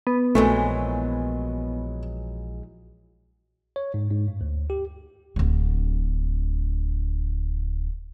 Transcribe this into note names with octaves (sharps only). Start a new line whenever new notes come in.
B3
A#1 E3 F#3 G#3 A3
C#5
G#2
G#2
G2
D2
G4
D1 D3